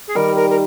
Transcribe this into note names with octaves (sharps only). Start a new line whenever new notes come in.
G#4
D#3 G3 A#4
A#4
A#4